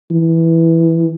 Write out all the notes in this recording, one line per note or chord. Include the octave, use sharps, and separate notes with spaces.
E3